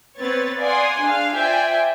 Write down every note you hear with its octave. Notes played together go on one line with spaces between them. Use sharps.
B3 C4 B4 C#5 A6 C#7
D5 F5 F#5 G#5 C6 D#6
D4 G#4 F5
F4 C5 D5 E5 G5 G#5